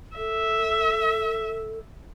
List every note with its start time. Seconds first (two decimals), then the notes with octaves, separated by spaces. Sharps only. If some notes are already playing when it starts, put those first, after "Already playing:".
0.16 A4 E5